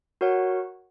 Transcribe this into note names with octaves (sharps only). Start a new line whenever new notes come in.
F#4 A#4 C#5 F#5